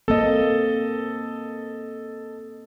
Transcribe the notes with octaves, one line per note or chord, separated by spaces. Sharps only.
A#3 C4 A4 D#5